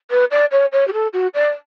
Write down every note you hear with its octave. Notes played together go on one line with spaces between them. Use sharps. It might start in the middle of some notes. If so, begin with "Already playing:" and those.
B4
D5
C#5
C#5
G4
A4
F#4
D5